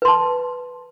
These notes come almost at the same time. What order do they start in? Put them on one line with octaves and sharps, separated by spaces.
B4 C6 A5